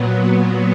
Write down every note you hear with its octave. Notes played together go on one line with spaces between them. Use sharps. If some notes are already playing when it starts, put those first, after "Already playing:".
Already playing: A#2 F#3 B3